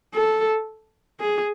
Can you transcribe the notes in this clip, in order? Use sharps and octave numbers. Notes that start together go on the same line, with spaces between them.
A4
G#4